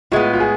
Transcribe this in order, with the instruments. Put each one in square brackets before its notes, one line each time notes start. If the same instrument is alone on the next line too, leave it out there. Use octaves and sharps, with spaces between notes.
[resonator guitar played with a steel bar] A2 G#3 B3 [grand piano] F4
[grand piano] F4
G#4